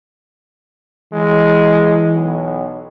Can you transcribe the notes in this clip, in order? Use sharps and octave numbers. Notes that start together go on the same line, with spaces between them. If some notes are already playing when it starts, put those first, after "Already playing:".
E3 G#3
B1